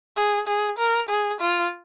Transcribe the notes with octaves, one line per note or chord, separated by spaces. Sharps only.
G#4
G#4
A#4
G#4
F4